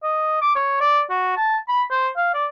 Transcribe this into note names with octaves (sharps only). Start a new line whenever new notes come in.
D#5
D6
C#5
D5
F#4
A5
B5
C5
F5
D5